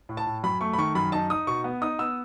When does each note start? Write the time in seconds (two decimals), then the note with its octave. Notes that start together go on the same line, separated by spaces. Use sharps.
0.09 A2
0.17 A5
0.27 A2
0.43 F#2 B5
0.61 A3 C#6
0.73 B5
0.78 D#3 C#6
0.95 F#2 B5
1.12 D#4 A5
1.30 D#4 D#6
1.47 B2 C#6
1.64 B3
1.82 D#4 D#6
1.99 B3 E6